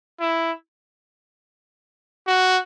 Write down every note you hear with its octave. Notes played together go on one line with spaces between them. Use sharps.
E4
F#4